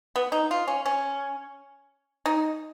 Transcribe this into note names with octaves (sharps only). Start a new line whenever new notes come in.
B3
D#4
F4
C#4
C#4
D#4